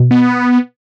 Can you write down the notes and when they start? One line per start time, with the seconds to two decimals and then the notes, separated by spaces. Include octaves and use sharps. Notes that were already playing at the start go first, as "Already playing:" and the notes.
Already playing: B2
0.11 B3